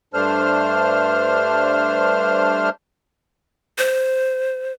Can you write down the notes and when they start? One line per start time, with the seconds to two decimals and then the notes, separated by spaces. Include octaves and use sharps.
0.14 G2 A3 D4 C5 F6
3.78 C5